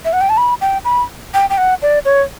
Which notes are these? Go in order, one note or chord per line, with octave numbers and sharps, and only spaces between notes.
E5
F#5
G5
A5
B5
G5
B5
G5
G5
F#5
D5
C#5